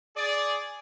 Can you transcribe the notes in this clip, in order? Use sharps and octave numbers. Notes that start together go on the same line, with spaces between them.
G#4 D5